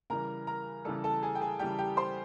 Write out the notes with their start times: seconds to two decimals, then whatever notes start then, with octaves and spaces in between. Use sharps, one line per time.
0.10 C#3 E3 G3 A#4 A#5
0.47 A#4 A#5
0.85 C#3 E3 G3 A4 A5
1.04 A4 A5
1.23 G#4 G#5
1.35 G5
1.41 G#4 G#5
1.59 C#3 E3 G3 G4 G5
1.79 G4 G5
1.97 C5 C6